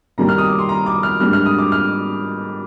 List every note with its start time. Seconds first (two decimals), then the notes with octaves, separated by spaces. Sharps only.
0.18 C3 D#3 G3 A#3 A#5
0.29 F6
0.38 D#6
0.48 D6
0.59 C6
0.69 A#5
0.86 D6
1.03 F6
1.20 G#2 G3 A#3 D4 F6
1.33 F6
1.46 D#6
1.58 D6
1.72 F6